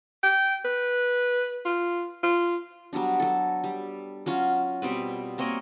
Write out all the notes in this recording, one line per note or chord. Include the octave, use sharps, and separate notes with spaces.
G5
B4
F4
F4
F#3 G3 B3 D4
F#3 A4
G3
F#3 C#4 F4 F#4
B2 G3 C4 B4
A#3 C4 C#5 D#5